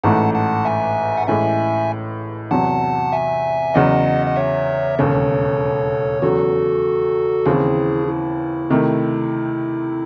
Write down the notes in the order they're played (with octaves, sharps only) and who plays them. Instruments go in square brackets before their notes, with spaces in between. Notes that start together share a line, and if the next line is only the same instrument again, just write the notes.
[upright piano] A1 G#2 E3 A3 [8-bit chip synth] F#5 A5
[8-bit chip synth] F#5 A5
E5 G#5
F#5
[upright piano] A1 A2 E3 G#3 [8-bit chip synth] E5 G#5
[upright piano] E2 C3 F#3 [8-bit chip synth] F#5 A5
[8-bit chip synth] E5 G#5
[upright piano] E2 C#3 F#3 [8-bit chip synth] D#5 F#5
[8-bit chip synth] D#5
C#5 E5
[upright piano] E1 D#2 C#3 [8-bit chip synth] A4 C#5
[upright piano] E2 C#3 F#3 [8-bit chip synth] F#4 A4
[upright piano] D#2 C#3 E3 C4 [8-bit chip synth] E4 G#4
[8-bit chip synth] E4
[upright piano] C3 D#3 A3